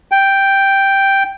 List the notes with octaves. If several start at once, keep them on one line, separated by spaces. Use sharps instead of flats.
G5